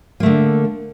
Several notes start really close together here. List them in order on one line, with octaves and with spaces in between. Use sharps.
A#3 A3 D3